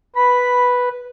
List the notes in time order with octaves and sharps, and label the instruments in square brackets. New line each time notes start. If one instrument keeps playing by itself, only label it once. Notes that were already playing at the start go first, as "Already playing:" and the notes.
[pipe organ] B4 [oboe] B5